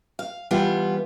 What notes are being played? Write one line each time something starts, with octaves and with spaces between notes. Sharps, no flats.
F5
E3 G3 B3 F4